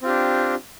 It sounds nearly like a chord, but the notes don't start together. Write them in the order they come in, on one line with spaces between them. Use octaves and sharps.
C4 F4 G4 D4